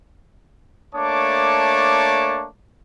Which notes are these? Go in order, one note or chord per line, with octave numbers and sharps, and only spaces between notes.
A3 A#3 D4 C#5 A5 D6